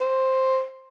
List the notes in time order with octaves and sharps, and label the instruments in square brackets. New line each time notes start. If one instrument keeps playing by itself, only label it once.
[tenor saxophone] C5